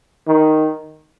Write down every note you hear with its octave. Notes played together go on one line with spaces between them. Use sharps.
D#3